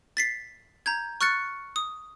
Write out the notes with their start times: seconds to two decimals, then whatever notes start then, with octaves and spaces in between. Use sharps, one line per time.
0.17 A6 B6 C7
0.86 A#5 G6 G#6
1.21 C#6 F6 F#6 A6 C#7
1.76 D#6